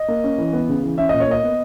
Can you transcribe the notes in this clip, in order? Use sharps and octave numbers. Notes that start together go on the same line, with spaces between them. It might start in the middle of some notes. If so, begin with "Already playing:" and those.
Already playing: D#5
A#3
C#4
E3
B3
C#3
E3
C#4 E5
A#2 D#5
C#5
A#3 D#5
B3